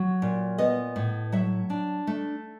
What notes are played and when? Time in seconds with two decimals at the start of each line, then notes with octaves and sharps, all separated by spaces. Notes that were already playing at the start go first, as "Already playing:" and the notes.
Already playing: F#3
0.22 A#2
0.58 B3 D#5
0.96 A2
1.32 F#3 E5
1.70 D4
2.07 A3